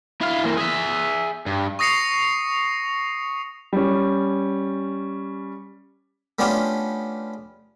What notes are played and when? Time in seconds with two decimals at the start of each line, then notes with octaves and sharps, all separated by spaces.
0.21 E4 F5
0.43 E3 A#3
0.57 G#4 E5
1.47 G2
1.79 C#6 D#6 A#6 C7 C#7 F7
3.73 G3 C#4
6.39 A3 B3 C#4 D4 F4 G4